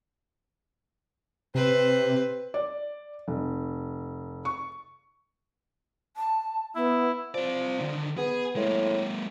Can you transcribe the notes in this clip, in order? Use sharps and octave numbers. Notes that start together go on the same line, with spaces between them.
C3 C4 B4
D5
F1
C#6
A5
B3 E4
F3 C4 D5
D3 D#3
B3 G#4
A2 G#3 A#3